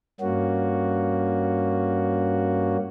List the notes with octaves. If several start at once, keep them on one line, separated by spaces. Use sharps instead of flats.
G2 A#3 C#4 F#4